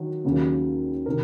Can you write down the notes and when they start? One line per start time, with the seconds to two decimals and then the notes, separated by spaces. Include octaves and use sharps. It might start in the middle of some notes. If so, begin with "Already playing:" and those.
Already playing: D#3 F#3
0.24 D#2 C#3 F#3 A#3
1.06 C3 D#3 A#4